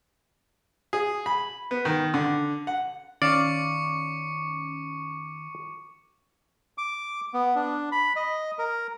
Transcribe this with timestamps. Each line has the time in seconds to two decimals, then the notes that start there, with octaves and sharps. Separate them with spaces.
0.93 G#4
1.26 B5
1.71 B3
1.85 D#3
2.14 D3
2.67 F#5
3.22 D#3 C#4 D5 F5 C#6 D6 C#7
6.78 D6
7.34 B3
7.55 D4
7.92 B5
8.16 D#5
8.59 A#4